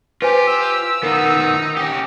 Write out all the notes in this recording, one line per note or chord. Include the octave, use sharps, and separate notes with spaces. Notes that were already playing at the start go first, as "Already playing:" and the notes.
F4 G4 B4 C5 G#5
E6
D#3 B3 D#4 A#4
C#4 G4